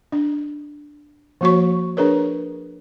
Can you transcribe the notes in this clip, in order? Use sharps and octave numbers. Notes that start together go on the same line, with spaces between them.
D4
F3 A#3 F#4 C#5 C#6
D4 G#4 A#4 B4 C#5